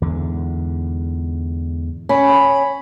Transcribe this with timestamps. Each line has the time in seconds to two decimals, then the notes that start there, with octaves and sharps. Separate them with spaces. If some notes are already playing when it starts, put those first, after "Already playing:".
0.02 E2 G#2 D3
2.09 C#4 B5